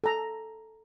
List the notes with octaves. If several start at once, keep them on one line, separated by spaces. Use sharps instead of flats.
A4 A#5